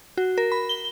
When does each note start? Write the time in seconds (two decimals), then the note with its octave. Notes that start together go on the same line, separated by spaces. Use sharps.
0.17 F#4
0.38 A#4
0.52 B5
0.69 G7